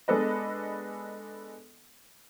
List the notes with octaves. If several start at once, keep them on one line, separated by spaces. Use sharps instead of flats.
G#3 B3 D4 A4 B4 D#5